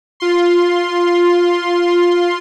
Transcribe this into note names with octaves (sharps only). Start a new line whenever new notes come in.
F4 C6